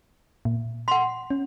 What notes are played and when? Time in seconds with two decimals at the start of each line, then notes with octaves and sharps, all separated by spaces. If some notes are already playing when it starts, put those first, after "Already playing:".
0.45 A#2
0.88 F#5 C6
1.30 C#4